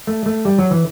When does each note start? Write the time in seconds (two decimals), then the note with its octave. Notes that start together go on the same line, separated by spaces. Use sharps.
0.07 A3
0.26 A3
0.45 G3
0.58 F#3
0.71 E3